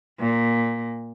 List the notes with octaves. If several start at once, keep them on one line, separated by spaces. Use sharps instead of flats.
A#2